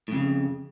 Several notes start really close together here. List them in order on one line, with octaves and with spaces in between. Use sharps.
A2 F2 C#3